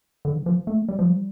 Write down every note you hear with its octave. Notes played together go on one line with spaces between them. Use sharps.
D3
E3
F3
A3
G3
F3
G3